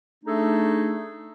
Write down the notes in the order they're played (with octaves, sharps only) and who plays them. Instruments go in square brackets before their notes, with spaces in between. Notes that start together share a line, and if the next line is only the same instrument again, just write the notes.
[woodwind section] A3 D4 D#4 G#4 A4